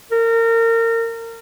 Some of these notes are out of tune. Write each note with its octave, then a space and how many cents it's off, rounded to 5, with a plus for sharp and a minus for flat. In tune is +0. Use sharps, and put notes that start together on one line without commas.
A#4 -30